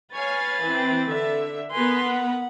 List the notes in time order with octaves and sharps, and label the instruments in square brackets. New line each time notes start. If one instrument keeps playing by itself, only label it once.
[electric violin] B4 A6 [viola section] C#5 F5 G#5
[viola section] E3 C4
D3 E5
[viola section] B3 A#4 B4 [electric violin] G#5 C6
[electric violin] F#5